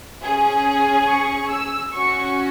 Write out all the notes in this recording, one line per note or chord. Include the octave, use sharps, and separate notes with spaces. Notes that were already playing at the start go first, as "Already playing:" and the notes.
C#4 G#4
G#5
C#6
E6
C#4 F#4 C#6